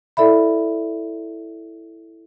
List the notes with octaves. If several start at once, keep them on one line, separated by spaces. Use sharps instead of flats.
E4 A4 D5 E5 B5